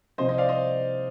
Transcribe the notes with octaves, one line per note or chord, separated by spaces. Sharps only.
C2 C3 F3 C5 D#5
C5 D#5
D5 F5
C5 D#5